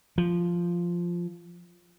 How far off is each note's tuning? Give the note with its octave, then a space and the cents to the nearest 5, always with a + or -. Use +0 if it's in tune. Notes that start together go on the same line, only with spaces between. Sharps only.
F3 -5